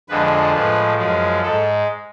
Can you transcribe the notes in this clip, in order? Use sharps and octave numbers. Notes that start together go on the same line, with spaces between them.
F2 D3 F3 G#3 B4
A2 F3 G#3 B4
F#2 F3 G#3
G#2 G#3 A4